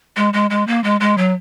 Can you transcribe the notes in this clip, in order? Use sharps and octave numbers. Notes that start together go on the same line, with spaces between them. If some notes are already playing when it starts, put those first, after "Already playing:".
G#3
G#3
G#3
A#3
G#3
G#3
F#3